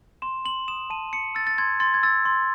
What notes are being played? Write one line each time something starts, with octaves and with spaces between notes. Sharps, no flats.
C6 E7
C6 F#7
D#6 E7
A5 D#7
C6 C#7
E6 A6
A6
C6 G#6
C6 A6
G#6
E6 A6
C6